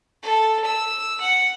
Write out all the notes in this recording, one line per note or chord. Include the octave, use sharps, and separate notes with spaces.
A4
E6
F#5